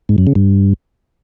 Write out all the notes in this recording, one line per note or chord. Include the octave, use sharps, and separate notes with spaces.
G#2
F#2
C#3
G2